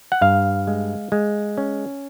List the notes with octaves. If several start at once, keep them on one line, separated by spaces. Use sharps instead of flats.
F#5
G2 F5
G#3
G#3
C#4